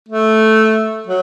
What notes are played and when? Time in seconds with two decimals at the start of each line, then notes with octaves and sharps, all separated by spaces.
0.09 A3
1.07 F#3